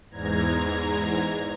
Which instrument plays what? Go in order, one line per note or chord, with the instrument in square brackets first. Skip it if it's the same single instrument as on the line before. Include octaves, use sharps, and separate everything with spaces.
[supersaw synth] E2 G#2 A#5 G#6